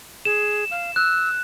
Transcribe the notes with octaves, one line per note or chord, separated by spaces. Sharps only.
G#4 E7
F5
E6 F#6